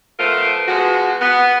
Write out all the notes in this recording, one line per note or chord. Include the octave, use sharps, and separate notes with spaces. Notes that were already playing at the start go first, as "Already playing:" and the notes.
F3 A3 B3 F4 A#4 C5
F3 G#3 B3 F#4
B3